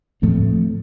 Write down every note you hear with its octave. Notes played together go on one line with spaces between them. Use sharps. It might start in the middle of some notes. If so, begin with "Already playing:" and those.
A2 F3 A3 C4